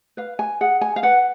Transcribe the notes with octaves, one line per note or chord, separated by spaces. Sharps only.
B4 F5
G#5
G#4 F#5
G#5
F5
B4 F#5